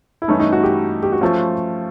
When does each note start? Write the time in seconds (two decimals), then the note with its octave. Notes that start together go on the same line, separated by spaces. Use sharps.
0.22 E4
0.28 G2 E3 A3 C#4 D#4
0.40 D#4
0.52 F#4
0.63 G4
1.03 G4
1.12 F#4
1.21 F3 A3 C#4 F4